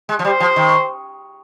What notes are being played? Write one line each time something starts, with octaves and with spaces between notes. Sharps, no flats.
G#3
F3
G3 C5
F3
D#3